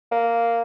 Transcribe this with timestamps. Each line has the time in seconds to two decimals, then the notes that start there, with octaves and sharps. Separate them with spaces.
0.12 A#3